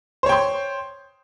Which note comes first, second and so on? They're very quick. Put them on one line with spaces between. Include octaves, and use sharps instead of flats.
C5 C#5 G5 C6